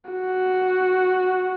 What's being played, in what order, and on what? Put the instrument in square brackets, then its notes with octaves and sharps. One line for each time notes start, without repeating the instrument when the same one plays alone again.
[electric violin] F#4